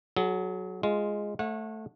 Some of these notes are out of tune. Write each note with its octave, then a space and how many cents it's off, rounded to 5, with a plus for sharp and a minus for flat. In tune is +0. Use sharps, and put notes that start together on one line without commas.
F#3 +0 G#4 +45
G#3 +0 F4 +0
A3 +0 C#5 -30 F#5 -25